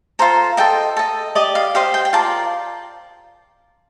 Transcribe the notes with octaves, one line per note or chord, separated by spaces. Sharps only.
F4 A4 C5 A#5
A4 D#5 G5
A4 D#5
G4 D5 D#5
F5
G4 C5 D#5 F5
G5
G5
F4 A#4 D5 A5